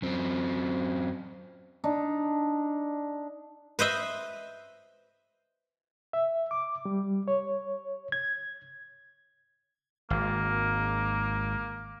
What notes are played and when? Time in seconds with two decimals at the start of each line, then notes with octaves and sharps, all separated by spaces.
0.02 F#2 C4
1.84 D4 D#4
3.79 B4 C5 D#5 E5
6.13 E5
6.51 D6
6.85 G3
7.28 C#5
8.12 G#6
10.10 G#1 A#3